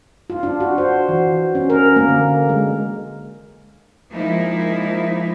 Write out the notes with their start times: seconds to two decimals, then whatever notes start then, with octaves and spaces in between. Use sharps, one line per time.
0.30 F4
0.43 D4
0.60 F#4
0.78 C5
1.09 E3
1.55 C#4
1.70 A#4
1.96 A#3
2.08 D3
2.49 G#3
4.12 F3 G#3 A#3 D#4 E4